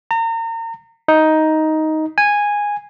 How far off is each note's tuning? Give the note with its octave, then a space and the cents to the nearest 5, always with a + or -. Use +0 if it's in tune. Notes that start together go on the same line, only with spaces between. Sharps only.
A#5 -35
D#4 +10
G#5 -10